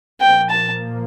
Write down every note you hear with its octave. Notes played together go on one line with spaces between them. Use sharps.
A#2 F3 A#3 G5
A5